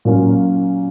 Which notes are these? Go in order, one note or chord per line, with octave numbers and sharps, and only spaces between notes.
A#2 F#3 A#3 C#4 F4